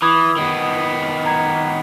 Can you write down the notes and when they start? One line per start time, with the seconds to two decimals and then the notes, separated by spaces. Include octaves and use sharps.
0.02 E3 B5 D#6 G#6
0.37 D#3 B3
1.26 A#5 G#6